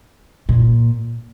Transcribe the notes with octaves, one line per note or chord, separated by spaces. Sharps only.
A#2